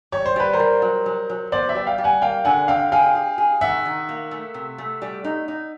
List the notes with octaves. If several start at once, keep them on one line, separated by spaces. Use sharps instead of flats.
G3 C#5
C5
G3 B4
A#4 C5
G3
F#3
F#3
F#3
B3 C5 D5
D5 E5
G3
F5 G5
G3
F#5 G#5
A#3 F5 G5
D3 F#5 G#5
D3 F5 G5
G#4 F5 G5
G#4
G#4
D#3 E5 F#5
D#3
A#3
A3
C3
A3
G3
D#4
D#4